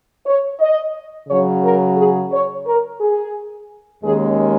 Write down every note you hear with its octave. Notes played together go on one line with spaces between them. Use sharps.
C#5
D#5
C#3 F#3 C#4 C#5
A#4
G#4
C#5
A#4
G#4
D#2 D#3 G#3 C#4 G#4